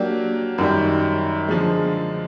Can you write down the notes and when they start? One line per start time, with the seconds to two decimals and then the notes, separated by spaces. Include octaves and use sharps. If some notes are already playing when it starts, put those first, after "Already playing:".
Already playing: F#3 A#3 D4 G4
0.58 F#2 D#3 G3
1.48 D3 F3 G#3